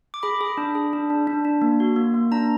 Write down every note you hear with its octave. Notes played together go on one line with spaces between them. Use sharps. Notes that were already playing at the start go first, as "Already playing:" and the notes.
D6
G#4 B5
G#4
D4
G#4
D4
D4
D4
D4
A#3
F#4
A#3
A#3
D4 A#5